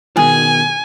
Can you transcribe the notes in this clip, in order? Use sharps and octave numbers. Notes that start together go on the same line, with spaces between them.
B2 D#3 G#4 G#5